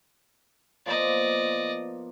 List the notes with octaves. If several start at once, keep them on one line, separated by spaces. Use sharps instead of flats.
F3 A#3 B3 D5 D#5